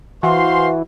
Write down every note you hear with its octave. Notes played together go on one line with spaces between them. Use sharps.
E3 F#4 C5 F5 C6